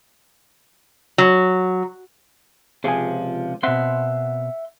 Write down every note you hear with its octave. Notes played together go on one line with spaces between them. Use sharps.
F#3
C#2 C3 F3 G#4 G#5
B2 C4 E5 F#5 C6